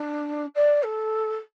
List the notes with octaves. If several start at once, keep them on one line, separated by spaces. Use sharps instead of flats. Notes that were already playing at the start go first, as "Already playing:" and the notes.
Already playing: D4
D5
A4